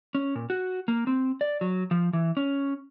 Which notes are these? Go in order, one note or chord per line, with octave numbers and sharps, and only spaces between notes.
C#4
A#2
F#4
A#3
C4
D5
F#3
F3
E3
C#4